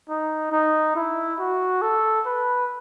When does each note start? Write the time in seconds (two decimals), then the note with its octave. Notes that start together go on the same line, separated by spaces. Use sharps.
0.09 D#4
0.52 D#4
0.95 E4
1.39 F#4
1.82 A4
2.26 B4